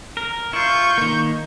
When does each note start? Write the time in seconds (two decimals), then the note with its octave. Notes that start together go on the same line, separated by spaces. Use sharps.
0.17 A#4
0.53 E4 F4 C#6 G6
0.98 D#3 A#3